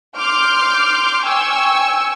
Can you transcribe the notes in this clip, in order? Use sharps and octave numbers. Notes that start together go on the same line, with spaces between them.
C6 D6 F6 G6
G5 G#5 C#6 E6